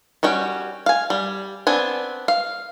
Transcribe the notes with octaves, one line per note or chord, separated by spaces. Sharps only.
G3 C#4 F#4 G5
F5 G#5
G3
B3 C4 D4 G#5
F5